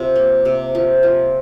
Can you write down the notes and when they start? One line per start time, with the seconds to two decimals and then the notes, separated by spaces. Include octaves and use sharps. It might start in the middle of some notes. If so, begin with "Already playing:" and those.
Already playing: C3 F3
0.16 A#3
0.45 C3
0.75 F3
1.03 F3